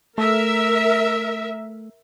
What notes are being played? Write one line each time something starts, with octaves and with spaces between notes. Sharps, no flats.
A3 A#4 E5